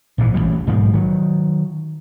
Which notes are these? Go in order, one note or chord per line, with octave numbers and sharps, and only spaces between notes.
A#1 G#2 C3 E3
A1 A#2 E3 G3
B1 G#2 D#3 F3
D#3 F#3